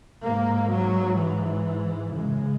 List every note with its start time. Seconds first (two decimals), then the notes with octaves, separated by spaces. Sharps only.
0.24 G#2 A#3
0.71 F#3
1.18 E3
2.13 F#2 C#3 G#3